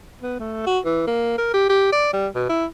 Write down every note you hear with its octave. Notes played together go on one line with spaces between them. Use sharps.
B3
A3
F#4
E3
A#3
A#4
G4
G4
D5
G3
B2
E4